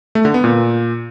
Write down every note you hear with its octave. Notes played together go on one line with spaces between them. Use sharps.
A3
D3
B3
A#2